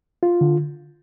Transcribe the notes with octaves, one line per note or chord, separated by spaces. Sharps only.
F4
D3